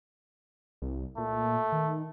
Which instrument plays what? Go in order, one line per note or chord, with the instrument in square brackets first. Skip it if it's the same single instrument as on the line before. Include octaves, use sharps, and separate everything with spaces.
[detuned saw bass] C2
[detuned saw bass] A#2 [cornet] A3
[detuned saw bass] D#3